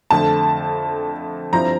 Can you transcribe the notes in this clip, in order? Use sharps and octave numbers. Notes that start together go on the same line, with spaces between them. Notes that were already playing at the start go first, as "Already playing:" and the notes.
F2 D3 A3 A5
G2 F3 C4 E4 A#5